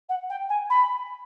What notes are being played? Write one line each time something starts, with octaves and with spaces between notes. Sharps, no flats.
F#5
G5
G#5
B5